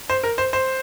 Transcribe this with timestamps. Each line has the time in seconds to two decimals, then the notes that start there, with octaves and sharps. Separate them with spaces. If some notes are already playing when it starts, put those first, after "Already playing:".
0.10 C5
0.23 A#4
0.38 C5
0.53 C5